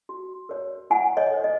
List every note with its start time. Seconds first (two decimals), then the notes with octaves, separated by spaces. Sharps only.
0.09 F#4
0.49 A#4 C#5
0.90 E4 F#5 G#5
1.17 C#5 D#5
1.30 A4 C5
1.44 D#5